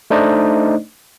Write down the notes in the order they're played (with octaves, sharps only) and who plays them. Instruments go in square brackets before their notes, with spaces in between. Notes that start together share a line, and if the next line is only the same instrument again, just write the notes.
[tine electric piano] A3 D4 D#4 C5 D5 D#5